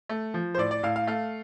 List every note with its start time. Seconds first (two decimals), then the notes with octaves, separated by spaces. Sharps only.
0.09 A3
0.34 F3
0.55 C5
0.58 A2 D5
0.71 D5
0.83 A2 F5
0.96 F5
1.07 A3 F5